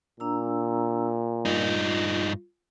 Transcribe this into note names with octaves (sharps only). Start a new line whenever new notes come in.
A#2 D4 A#5 E6
G2 D#4 F4